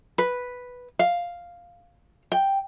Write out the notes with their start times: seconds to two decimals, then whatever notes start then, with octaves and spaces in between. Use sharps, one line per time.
0.18 B4
0.99 F5
2.32 G5